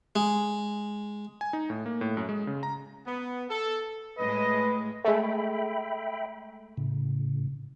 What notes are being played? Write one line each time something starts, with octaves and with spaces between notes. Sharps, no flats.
G#3
G#5
D#4
A2
A#3
A2
F#2
G#3
C#3
A#5
B3
A4
A2 G#3 B4 D#5
G#3 A3 E5 G5 B5
A2 C#3